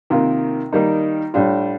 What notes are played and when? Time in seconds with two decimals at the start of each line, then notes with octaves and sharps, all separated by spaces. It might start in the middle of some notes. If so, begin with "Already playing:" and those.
0.10 C3 D#3 A#3 F4
0.73 D#3 G3 A#3 D#4
1.34 A2 G3 D4 F4